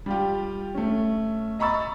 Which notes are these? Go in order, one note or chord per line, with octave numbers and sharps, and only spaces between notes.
G3 F4 G4
A3 C#4
D#5 A#5 B5 C#6 E6 A6